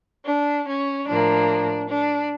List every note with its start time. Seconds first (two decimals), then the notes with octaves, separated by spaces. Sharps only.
0.25 D4
0.66 C#4
1.06 A2 F3 A#3 D4
1.88 D4